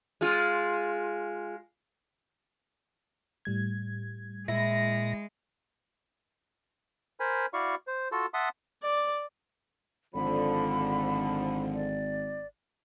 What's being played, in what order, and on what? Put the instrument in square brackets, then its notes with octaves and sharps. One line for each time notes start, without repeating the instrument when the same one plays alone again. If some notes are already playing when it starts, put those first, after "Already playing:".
[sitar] G#3 F4
[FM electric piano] A2 G3 G#6
[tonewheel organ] A#2 A#6 [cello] G#3 [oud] E4
[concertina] A#4 C5 G#5 B5
E4 F#4 D5 F5 C#6
C5
F4 F#4 A4 A5
E5 F#5 A5 C6 D#6
[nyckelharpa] D5
[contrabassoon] G#1 [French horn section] D3 F3 [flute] B5
[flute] D5